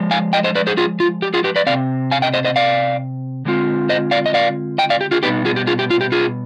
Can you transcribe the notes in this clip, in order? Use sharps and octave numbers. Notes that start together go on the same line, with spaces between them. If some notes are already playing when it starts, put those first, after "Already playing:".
Already playing: F3 G#3
F5 G#5
D#5 G5
C5 D#5
B4 D5
G#4 C5
F4 G#4
F4
G4
F4 G#4
G4 B4
B4 D5
C3 F3 C4 D5 F5
F5 G#5
D#5 G5
C5 D#5
C5 D#5
D5 F5
D3 G#3 C4 F4
C5 D#5
D5 F5
D#5
D5 F5
D#5 G5
D5 F5
G4
F4 G#4
B2 G3 B3 D#4 G4 B4
F4 G#4
G4
F4 G#4
G4
F4
G4
F4 G#4